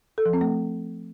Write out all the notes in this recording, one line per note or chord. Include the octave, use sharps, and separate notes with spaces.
A4
F3
C4
A3